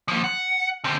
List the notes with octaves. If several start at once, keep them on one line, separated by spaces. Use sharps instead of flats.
F3 A#3
F#5
D3 C4